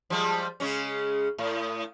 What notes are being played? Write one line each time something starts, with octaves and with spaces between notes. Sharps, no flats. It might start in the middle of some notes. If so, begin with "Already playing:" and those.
F3 G3 G#3
C#3 G#3 C#4
A2